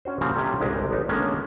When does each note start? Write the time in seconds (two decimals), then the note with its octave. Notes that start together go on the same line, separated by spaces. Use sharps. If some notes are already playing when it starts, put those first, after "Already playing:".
0.05 C#4 F#4 C5
0.21 A#2 C#3 F3 G3 A#3 C4
0.34 C3 G3 C#4 G4 A4 A#5
0.61 G1 C2 G#3 C4 G4
0.91 A1 B3 D#4
1.09 D3 D#3 G#3 A#3 B3 C#4